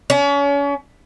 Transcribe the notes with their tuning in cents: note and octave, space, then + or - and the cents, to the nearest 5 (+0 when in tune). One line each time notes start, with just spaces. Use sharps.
C#4 +35